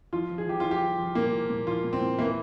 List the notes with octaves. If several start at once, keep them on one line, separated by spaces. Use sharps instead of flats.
F3 F4
F3
G#4
F3 G4
F3 F4
G4
F3
F3
A#2 A#3
A#2
A#2
F3 F4
A#2
C4
A#2
E3 A#3